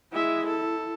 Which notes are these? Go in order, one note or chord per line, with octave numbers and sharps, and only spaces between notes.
G#3 E4 E5
A4